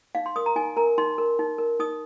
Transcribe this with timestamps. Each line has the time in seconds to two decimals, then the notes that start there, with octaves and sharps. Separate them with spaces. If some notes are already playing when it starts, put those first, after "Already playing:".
0.15 D#4 F5
0.26 C6
0.36 A#4 D#6
0.46 A#5
0.56 D#4 G#5
0.77 A#4 A#5
0.98 D#4 C6
1.18 A#4
1.39 D#4
1.58 A#4
1.79 D#4 D#6